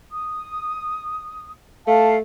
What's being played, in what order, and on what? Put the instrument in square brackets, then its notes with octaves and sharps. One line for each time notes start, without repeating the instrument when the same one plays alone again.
[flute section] D#6
[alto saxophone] A3 [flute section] F5 A5